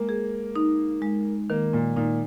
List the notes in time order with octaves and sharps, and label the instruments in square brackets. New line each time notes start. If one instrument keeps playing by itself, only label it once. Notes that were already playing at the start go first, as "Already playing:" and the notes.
Already playing: [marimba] G#3 [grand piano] A#3
[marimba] G#4
D#4
G#3
[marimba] D#3 [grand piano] A#3
[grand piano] A#2
[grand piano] A#2 [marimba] D#4